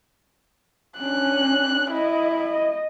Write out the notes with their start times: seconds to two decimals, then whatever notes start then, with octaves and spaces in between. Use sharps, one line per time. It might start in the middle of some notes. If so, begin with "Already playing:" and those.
0.98 C#4 D4 F#6
1.91 E4 D#5
2.41 D#5